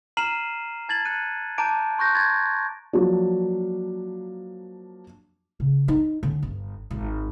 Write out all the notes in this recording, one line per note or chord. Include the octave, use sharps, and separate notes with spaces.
A#5 F6 C7 D#7 E7 F#7
A5 G#6 A6 F#7
F#6 C#7 D#7
A5 A#5 D6 G6 D7
C6 C#6 F#6 G6 A#6
C6 G#6 A6
F3 F#3 A#3 D4
C#3
D#4
D3 C#4
G1
G#1